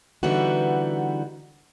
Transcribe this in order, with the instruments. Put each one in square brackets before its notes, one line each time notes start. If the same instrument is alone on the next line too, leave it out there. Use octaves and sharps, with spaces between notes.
[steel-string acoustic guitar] D3 E3 G3 B3 D#4 F#4